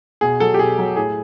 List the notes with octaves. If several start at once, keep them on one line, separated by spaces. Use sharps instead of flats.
B2 G#4
F#3 A4
G4
B2 G#4
F#3
A2 G#4